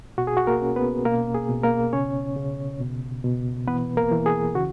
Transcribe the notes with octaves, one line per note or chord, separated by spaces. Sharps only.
B2 F#4
G#4
F#4
A#3 A#4
C#4
B3 B4
B2 A#3 A#4
G#4
B2
A#3 A#4
C#3 C#4 C#5
C#3
B2
B2
E3 B3 B4
A#3 A#4
E3
G#4
C#3 F#4